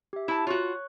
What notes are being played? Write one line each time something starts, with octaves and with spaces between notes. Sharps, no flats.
G4 E5
E4 A5
F4 F#4 C#5 C#6 F#6